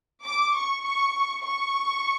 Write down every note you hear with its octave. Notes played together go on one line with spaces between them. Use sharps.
D6
C#6
C#6
C#6